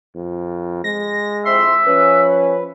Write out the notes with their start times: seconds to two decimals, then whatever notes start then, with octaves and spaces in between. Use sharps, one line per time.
0.15 F2
0.84 G#3 A#6
1.45 F2 C4 E4 E5 C6
1.87 F3 C#4 B4